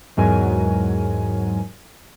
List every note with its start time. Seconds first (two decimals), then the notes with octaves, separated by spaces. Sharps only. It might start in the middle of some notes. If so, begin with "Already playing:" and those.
0.17 E2 G#2 F#3 A#4 G#5